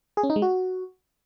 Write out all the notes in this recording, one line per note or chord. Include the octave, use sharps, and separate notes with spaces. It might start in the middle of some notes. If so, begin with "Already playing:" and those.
G#4
C#4
D#4
G#3
F#4